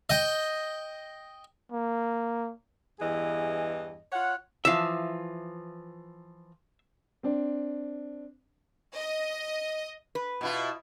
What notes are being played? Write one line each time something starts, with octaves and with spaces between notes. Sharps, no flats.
D#5 G5
A#3
E2 G2 E3 G#4 D#5
F4 C#5 F#5
E3 F3 E5 F5
C4 D4
D#5
B4
B2 E4 F4